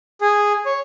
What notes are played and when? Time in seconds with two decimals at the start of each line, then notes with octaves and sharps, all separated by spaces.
0.21 G#4
0.66 C#5